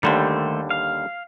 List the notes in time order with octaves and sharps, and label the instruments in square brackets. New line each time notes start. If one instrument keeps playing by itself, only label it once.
[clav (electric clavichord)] D#2 D3 G3 [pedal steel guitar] D#3 A3 C5
[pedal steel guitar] F5